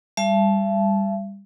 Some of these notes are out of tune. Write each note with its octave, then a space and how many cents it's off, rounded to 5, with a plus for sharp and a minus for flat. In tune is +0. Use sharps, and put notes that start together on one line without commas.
G3 +20 E5 +45 A5 -20